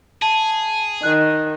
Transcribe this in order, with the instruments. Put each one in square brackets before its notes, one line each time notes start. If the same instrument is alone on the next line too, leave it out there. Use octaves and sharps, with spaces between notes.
[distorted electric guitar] G#4 [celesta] A5
[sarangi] D#3 [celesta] F#6